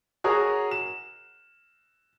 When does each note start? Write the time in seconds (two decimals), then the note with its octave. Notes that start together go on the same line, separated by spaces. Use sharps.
0.24 F#4 G#4 A#4 C#5 D#6
0.71 E7